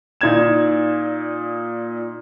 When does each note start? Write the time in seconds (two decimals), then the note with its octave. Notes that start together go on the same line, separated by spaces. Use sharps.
0.21 A#2 D#4 D5 G#6 E7